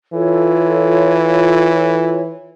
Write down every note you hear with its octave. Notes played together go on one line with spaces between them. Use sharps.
E3 F4 A4 C#5